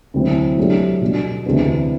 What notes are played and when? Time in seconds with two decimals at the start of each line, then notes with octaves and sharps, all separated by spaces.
0.14 D2 C3 F#3 C4 E4
0.57 F#3 A3 D4 G4
1.01 B2 G3 D4
1.45 D2 C3 E3 B3 D4